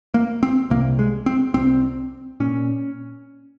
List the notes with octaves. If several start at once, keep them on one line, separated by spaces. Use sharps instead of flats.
A#3
C4
C2 C3 A#3
G#3
C4
C2 C3 C4
A#2 C#4